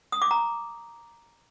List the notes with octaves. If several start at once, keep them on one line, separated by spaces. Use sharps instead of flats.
D#6
D6
A#5